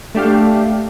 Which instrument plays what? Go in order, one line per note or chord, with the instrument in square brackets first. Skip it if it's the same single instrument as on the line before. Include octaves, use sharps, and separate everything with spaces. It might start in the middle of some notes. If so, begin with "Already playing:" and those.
[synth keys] A3 D4 G4 F5